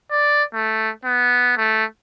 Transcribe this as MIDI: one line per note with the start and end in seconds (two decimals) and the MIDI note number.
0.11 0.43 74
0.54 0.90 57
1.05 1.53 59
1.57 1.85 57